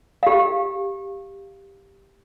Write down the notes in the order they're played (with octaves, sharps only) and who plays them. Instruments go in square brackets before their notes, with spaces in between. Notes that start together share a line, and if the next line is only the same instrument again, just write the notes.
[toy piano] G4 F5